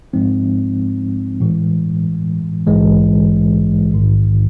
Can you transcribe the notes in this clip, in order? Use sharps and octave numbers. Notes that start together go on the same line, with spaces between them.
G#2 F3 G#3 C4 D#4
A2 E3 G#3
A#1 G#2 E3 G#3
A#1 G#2 D#3